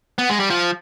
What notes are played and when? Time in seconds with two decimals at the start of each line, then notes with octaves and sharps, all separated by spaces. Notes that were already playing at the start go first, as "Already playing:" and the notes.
0.18 B3
0.29 G#3
0.40 G3
0.50 F3